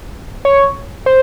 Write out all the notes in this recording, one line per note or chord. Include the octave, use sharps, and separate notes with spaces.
C#5
C5